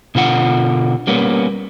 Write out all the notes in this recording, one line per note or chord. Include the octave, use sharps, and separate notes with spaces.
B2 D3 F4 F#5
G3 A#3 B3 C#4